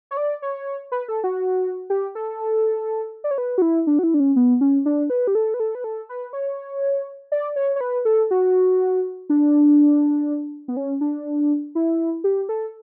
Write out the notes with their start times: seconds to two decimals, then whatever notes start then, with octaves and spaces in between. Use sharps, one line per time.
0.11 C#5
0.17 D5
0.42 C#5
0.92 B4
1.08 A4
1.24 F#4
1.90 G4
2.15 A4
3.24 D5
3.31 C#5
3.38 B4
3.58 F#4
3.62 E4
3.87 D4
3.99 F#4
4.03 E4
4.14 D4
4.20 C#4
4.36 B3
4.61 C#4
4.86 D4
5.10 B4
5.27 G4
5.35 A4
5.54 B4
5.60 A4
5.75 B4
5.84 A4
6.09 B4
6.33 C#5
7.32 D5
7.56 C#5
7.76 C#5
7.81 B4
8.05 A4
8.31 F#4
9.30 D4
10.68 B3
10.77 C#4
11.01 D4
11.75 E4
12.24 G4
12.49 A4